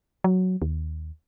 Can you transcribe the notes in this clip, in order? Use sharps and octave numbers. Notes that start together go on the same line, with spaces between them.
F#3
D#2